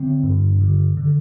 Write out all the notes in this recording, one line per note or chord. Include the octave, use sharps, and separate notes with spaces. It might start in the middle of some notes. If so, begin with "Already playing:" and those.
Already playing: D3 C4
G2
D3
D3